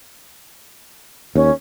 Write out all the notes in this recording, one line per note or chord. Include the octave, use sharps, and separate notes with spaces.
D#2 C#4